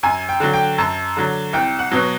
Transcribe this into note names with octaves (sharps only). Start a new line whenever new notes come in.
F#2 G#5
G5
D3 F#3
G5
F#2 A5
D3 F#3
C2 G5
F#5
B2 F#3